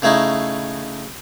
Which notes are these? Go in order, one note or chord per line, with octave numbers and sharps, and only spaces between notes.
C#3 A3 C#4 D#4 E4